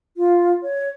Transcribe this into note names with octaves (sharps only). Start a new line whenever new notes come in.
F4
C#5